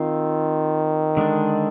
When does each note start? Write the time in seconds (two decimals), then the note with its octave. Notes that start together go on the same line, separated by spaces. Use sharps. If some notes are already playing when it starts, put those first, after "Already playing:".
Already playing: D#3 C4 F4
1.17 D3 G#3 D4